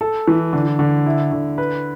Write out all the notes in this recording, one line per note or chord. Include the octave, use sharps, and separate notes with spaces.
A4
E3
D3
D3
E4
D3
B4